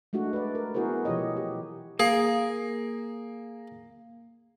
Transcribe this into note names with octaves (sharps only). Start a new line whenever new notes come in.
G#3 A3 D4 F#4
B4 D5
A#4
B3 E4 F#4 G#4 A#4 C5
B2 E3 F3 G4 C#5 D#5
G4
A#3 G#4 F5